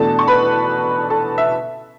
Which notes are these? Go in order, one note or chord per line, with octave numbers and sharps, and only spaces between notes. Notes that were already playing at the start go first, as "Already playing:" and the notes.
Already playing: E2 B2 A3 D4 A4 A5
C#6
B4 B5
A4 A5
E5